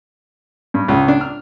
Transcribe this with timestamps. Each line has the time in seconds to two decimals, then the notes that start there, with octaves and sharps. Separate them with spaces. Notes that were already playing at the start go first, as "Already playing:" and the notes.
0.74 G2
0.88 C#2
1.08 D4
1.21 F6